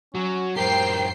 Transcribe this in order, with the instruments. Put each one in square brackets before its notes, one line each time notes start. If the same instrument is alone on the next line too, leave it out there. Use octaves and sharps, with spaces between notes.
[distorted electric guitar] F#3 [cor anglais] C#4
[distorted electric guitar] F#2 G4 [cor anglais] A#4 [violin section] C5 G5 C7